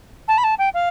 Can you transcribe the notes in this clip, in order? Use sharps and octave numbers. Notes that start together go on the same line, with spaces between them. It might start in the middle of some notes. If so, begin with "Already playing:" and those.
A5
B5
A5
G5
F5